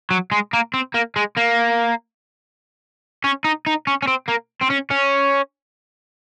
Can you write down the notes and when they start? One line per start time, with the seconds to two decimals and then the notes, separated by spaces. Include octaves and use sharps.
0.11 F#3
0.31 G#3
0.53 A#3
0.74 C4
0.94 A#3
1.16 G#3
1.37 A#3
3.24 C#4
3.45 D#4
3.67 D#4
3.87 C#4
4.03 C#4
4.08 C4
4.29 A#3
4.62 C4
4.71 C#4
4.91 C#4